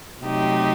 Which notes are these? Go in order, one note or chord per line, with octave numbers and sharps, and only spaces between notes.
C3 F#3 A3 D#4 G4